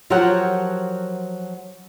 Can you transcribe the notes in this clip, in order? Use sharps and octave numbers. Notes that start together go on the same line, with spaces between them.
F3 F#3 G4 A#4 C#5 F#5